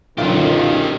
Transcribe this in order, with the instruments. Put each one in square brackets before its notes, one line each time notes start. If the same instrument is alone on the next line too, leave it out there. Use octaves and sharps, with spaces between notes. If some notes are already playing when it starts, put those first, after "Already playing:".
[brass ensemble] B1 F#2 D#3 [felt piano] A#2 D3 [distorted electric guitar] C#4 G4 [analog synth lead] F4